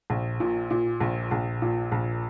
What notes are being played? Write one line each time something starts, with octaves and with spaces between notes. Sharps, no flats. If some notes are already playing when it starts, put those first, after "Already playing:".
A#1
A#2
A#2
A#1
A#1
A#2
A#1